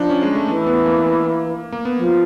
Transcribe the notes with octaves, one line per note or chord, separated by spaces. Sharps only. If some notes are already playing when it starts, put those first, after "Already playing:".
Already playing: F3 D4 D#4
C#4
G#3
A3
E3 A3
B3
A#3
A#3
B3
F3